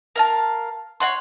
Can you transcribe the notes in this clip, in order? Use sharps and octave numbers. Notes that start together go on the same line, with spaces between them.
A#4 F5 A5
C#5 D#5 F#5 C6